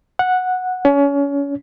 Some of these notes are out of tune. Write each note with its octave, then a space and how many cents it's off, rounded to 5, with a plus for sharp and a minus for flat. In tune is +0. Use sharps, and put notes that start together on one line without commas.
F#5 -10
C#4 +30